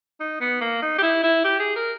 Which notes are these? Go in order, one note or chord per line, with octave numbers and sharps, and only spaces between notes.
D#4
B3
A#3
D#4
G4
E4
E4
G4
G#4
A#4